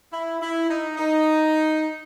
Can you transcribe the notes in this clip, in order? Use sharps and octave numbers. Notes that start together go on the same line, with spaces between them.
E4
E4
D#4
D#4